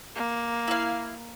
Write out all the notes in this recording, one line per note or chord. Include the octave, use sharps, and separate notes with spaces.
A#3
E4 F5